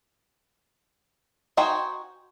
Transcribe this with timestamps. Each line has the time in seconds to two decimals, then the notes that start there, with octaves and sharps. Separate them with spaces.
1.57 D#4 F#4 C5 G5 G#5